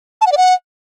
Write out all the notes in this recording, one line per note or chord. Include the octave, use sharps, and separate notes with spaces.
A5
F#5
D5
F#5